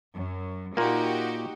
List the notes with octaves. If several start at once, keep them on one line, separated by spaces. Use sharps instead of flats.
F#2
A#2 A#3 D#4 F#4 G4